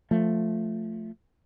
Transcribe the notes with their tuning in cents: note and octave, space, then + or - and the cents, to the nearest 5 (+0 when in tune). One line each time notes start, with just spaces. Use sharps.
F3 +0 A3 +0